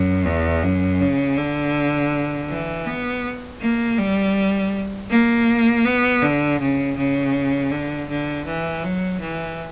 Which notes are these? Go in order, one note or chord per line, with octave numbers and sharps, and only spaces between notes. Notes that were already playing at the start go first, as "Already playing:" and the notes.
Already playing: F#2
E2
F#2
C#3
D3
E3
B3
A#3
G3
A#3
B3
D3
C#3
C#3
D3
D3
E3
F#3
E3